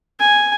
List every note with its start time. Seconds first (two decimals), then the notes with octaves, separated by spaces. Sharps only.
0.20 G#5